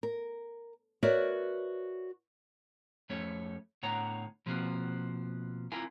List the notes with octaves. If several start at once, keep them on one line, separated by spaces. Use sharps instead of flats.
A#4
F#4 A#4 B4 C#5 D5 E5
F2 A3 C#4 A4 C#5
A2 D3 B3 C#5 F#5 A#5
B2 F3 A#3 C4 F#4
C4 E4 F4 A#4 G5 G#5